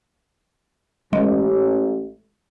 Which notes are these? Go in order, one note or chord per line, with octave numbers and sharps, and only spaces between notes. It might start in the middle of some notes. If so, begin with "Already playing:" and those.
A1 G#3